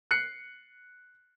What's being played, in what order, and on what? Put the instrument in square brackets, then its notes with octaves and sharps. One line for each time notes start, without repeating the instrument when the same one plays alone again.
[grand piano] F#6 C7 C#7